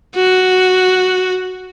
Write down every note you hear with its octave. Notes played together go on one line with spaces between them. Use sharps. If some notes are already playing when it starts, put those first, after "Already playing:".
F#4